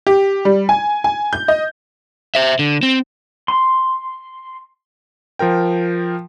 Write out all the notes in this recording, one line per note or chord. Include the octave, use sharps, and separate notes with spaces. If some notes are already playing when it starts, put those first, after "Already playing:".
G4
G3
G#5
G#5
G6
D#5
C5 E5
D3
C4
C6
F3 F4 A#4 G5